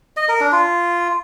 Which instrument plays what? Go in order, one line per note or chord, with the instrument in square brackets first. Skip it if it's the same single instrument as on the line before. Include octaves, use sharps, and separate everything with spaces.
[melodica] D#5
A#4
D4
F4